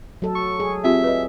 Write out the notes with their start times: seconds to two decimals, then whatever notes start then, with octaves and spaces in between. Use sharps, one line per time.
0.22 F#3 A4
0.35 C#6
0.60 G#4
0.84 C4 F4 G4 E5
1.04 B4 D#5